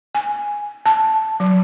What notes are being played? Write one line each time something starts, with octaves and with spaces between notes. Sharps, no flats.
G#5
A5
F#3